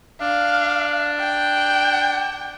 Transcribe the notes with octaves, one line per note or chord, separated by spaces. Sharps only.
D4 F5
G5